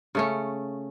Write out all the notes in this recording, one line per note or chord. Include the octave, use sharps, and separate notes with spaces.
C#3 A3 C#4